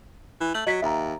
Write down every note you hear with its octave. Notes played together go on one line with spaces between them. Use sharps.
E3
A3 F#7
F#3 D#5 B6
D#2 E5 A#5